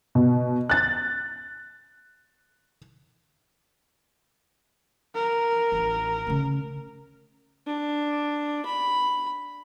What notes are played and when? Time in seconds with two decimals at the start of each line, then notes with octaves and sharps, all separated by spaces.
0.15 B2
0.70 F#6 A6
5.15 A#4
5.72 A1
6.27 C#3 A3
7.66 D4
8.66 B5